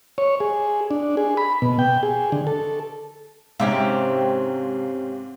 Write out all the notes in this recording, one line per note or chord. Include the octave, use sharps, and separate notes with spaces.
C#5
G#4
D4
G#4
B5
B2
G5
G#4
D3
A4
G#2 C3 C#4 G4 E5 F5